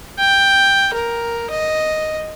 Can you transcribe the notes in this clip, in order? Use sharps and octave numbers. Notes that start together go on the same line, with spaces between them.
G5
A#4
D#5